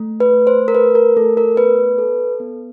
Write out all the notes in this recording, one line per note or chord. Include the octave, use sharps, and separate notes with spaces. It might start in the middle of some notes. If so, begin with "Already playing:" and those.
Already playing: A3
B4
A3
C5
A#4
A3 B4
A#4
A3 A4
A#4
B3 B4
A4
B3